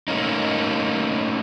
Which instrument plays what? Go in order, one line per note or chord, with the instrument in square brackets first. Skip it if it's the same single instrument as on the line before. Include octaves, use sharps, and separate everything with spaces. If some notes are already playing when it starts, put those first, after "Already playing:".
[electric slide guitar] A3 A#3 C#4 D#4